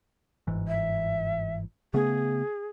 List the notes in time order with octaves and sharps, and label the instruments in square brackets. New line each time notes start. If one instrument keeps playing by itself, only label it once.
[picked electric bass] G1 G#2 E3
[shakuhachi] E5
[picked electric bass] C#3 A3 B3 [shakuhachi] G#4